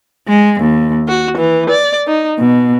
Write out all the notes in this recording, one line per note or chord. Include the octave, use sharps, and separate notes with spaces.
G#3
D#2
F#4
E3
D5
D#4
B2